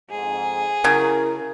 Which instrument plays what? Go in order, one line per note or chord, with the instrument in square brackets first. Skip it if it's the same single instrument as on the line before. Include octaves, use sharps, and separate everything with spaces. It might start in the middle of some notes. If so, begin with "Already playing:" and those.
[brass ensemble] F2 G#2 [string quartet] G#4
[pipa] C#3 F#3 [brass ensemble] E4 A#4